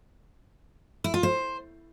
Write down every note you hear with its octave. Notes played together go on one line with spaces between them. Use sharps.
E4
F4
C5